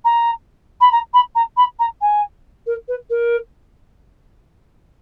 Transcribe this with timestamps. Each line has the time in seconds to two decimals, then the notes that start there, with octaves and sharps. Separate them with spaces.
0.04 A#5
0.80 B5
0.91 A#5
1.13 B5
1.35 A#5
1.56 B5
1.79 A#5
2.01 G#5
2.66 A#4
2.88 B4
3.10 A#4